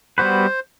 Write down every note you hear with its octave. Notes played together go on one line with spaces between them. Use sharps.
G3 B3 F#4 B4 C5